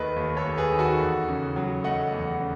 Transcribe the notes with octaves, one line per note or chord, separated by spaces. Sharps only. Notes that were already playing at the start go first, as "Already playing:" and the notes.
Already playing: D#2 D#3 A3 B4 D#5
D#2
A4 C#5
D#2
G#4 B4
D#3
F#4 A4
E2
C#3
F#3
A3 D#5 F#5
E2
C#3